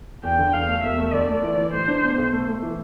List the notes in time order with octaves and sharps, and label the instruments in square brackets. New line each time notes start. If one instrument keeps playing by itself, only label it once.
[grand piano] E2 [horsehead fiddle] G5
[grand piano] D3
[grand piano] E2 [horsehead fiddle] F5
[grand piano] A3
[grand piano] E1 [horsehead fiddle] E5
[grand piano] A3
[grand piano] D2 [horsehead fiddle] D5
[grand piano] A3
E3
E3
[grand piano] A2 [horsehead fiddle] C5
[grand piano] D4
B2
B1
A3
A3
E3